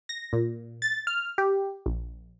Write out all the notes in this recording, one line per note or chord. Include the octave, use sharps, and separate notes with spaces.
A#6
A#2
A6
F6
G4
A#1